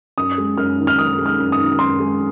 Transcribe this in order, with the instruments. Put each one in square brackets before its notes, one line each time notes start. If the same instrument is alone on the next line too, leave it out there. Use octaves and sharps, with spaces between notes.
[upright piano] F#2 D#6
G#3
F#2 F6
D#3
F6
F#2 D#6
G#3
F6
F#2
D#6
D#3
F#2 C6
G#3